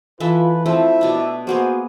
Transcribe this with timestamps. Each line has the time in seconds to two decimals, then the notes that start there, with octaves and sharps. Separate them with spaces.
0.20 E3 F4 A4 B4 E5
0.66 F3 A3 C4 E4 E5
1.01 B2 D4
1.47 A#3 B3 F#4 G#4 C5